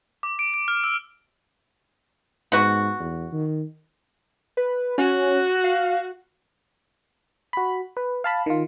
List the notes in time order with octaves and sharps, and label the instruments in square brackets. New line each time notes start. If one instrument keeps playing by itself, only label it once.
[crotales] D6
D7
D7
F6
E6
[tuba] G#2 [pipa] B3 F#4
[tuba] E2
D#3
[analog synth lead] B4
[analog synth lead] C#4 [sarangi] F#4
[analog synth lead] F5
[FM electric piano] F#4 B5
B4
F5 A5 B5
D#3 F4